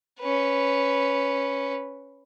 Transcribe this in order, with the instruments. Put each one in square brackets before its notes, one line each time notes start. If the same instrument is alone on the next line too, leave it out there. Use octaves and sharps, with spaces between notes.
[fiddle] C#4 B4